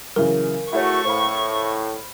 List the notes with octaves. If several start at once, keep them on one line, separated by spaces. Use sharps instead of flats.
C#3 E3 F#3 A#4
A3 E4 F#4 G#4 C#5 C#6
A2 C5 F5 B5